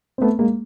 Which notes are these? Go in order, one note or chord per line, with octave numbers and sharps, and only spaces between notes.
C4
A3 B3
G#3 A#3